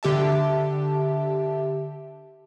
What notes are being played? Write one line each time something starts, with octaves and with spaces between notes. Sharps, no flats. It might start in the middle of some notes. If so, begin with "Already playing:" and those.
D3 G4 E5 A5